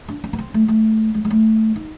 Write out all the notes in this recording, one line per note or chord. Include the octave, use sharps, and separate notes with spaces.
D4
C#4
B3
C4
A3
A3
G#3
G#3
A3
D#4